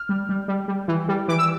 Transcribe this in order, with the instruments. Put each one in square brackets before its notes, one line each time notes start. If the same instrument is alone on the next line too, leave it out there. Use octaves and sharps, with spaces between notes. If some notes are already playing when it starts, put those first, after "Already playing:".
Already playing: [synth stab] F6
G3
G3
G3
G3
E3
G3
E3 D6
E6